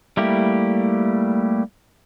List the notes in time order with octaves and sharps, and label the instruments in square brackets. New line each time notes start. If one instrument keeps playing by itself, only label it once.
[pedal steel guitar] G3 A3 A#3 E4 G4